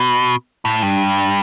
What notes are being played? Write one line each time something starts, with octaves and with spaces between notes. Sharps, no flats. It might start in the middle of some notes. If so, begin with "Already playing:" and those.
Already playing: B2
A2
G2